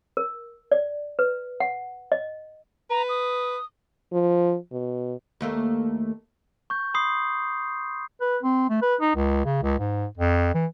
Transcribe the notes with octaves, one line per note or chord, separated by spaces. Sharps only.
A#4
D5
B4
F#5
D#5
B4 A#5
D#6
F3
B2
D#2 A3 A#3
C#6 G6
B5 C6 D#6 C7
B4
C4
A3
B4
D#4
C#2
C#3
C#2
G#2
F2
E3